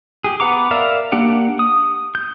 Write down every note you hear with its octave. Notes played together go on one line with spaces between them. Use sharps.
G4 G#4
B3 B4 F#5 A#5 D6
A#4 D5 E5 F5
A#3 D4 G4 F#5
D#6
G6